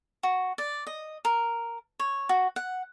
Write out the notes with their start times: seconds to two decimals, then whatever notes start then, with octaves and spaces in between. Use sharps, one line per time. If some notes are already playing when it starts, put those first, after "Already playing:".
0.23 F#4
0.58 D5
0.87 D#5
1.25 A#4
2.00 C#5
2.29 F#4
2.56 F#5